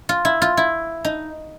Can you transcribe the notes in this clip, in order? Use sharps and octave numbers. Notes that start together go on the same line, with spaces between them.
F4
E4
F4
E4
D#4